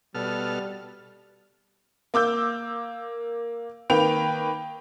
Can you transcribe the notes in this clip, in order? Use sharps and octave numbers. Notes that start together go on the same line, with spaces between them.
B2 G3 A4 F6
A#3 D6 E6 G6
D#3 A#3 B4 G5 F7